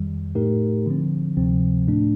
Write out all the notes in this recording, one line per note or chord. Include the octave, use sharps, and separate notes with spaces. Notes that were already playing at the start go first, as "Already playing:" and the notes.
Already playing: F2 D#3 G3
A2 A3 D#4 G4 A#4
D3 F3 C4
D2 C3 F3 C4
A2 A3 D4